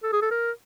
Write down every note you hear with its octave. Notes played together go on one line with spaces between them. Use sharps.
A4
G#4
A4
A#4